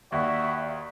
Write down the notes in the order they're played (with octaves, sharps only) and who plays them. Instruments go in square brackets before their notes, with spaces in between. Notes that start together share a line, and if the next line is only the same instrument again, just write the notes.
[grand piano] D#2 [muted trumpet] F#4 [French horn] D5 [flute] E5